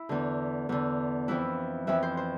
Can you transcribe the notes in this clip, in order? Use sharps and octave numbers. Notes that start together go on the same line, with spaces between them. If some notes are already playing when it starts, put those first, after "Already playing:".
Already playing: E4
E2 D3
E2 D3
F2 E3 E4
F2 E3 E5
C5
C5